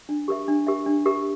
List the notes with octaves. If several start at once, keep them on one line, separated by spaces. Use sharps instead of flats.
D4
G4 A#4 E5
D4
G4 A#4 E5
D4
G4 A#4 E5